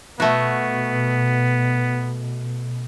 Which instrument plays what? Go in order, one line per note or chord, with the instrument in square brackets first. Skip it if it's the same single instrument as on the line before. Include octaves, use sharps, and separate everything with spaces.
[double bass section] B2 [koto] A3 F#4 [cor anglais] B3